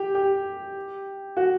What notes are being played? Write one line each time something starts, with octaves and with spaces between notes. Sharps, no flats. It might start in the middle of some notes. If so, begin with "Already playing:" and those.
Already playing: G4
G4
F#4